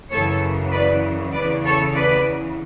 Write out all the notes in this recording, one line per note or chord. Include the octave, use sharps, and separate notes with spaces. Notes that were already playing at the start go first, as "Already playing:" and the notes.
F#2 C#3 E3 A4 C#5
B4 D5
E2 C#3 E3 B4 D5
A4 C#5
B4 D5